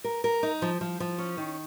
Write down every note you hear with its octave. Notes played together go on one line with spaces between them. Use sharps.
A#4
A#4
D#4
F3
F3
F3
C#4
D#3